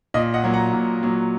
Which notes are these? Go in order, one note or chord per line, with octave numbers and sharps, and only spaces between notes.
A#2 D#5
D#5 F#5
F#3 A#3
F#5 A#5
A#2
F#3 A#3